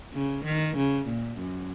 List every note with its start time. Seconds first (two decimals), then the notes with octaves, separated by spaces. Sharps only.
0.14 C#3
0.45 D#3
0.77 C#3
1.07 A#2
1.39 F#2